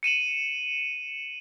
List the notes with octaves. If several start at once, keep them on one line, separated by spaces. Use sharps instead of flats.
C#7 D#7 E7 F#7